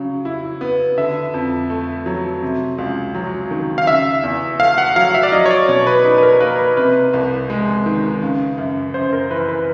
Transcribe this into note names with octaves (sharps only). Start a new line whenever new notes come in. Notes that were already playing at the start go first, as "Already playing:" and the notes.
Already playing: C#3 F#3
E4
B3
D3 E5
F2
A3
F#3
C3
C#2
F#3
D#3
F5
C#3 E5
E2
A3 F5
F#5
F#3 F5
E5
D5
F#3 D#5
C#5
D5
B2 C#5
B4
D#4 B4
B4
A#4
A#3 B4
B4
C3 B4
C2
G#3
D#3
C#3
F#2
F#2 C5
A#4
E3 B4
B4